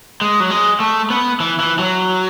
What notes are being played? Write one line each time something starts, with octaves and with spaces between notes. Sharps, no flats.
G#3
F#3
G#3
A3
B3
E3
E3
F#3